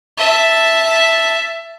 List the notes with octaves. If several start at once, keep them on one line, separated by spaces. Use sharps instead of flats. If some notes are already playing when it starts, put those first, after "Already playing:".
E5 A5